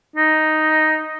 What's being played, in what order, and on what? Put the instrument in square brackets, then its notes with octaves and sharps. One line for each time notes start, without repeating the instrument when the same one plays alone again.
[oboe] D#4